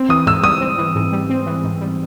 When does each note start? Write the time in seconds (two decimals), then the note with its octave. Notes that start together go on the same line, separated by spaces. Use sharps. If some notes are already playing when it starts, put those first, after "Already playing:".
Already playing: C4
0.09 E3 D#6
0.26 G#2 E6
0.43 G3 D#6
0.61 C4
0.78 E3
0.95 G#2
1.12 G3
1.30 C4
1.46 E3
1.64 G#2
1.81 G3